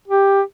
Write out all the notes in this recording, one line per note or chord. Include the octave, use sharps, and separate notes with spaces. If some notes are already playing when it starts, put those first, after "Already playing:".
G4